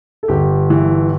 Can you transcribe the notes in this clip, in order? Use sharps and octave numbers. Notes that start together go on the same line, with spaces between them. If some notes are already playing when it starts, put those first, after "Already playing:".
A4
G1 G4
E3